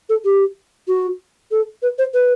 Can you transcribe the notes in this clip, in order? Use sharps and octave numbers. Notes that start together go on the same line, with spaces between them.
A4
G4
F#4
A4
B4
C5
B4